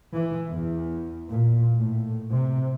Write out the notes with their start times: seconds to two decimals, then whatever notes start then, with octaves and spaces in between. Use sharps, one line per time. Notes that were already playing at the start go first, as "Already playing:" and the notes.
0.14 E3
0.49 E2
1.30 A#2
1.76 A2
2.31 C3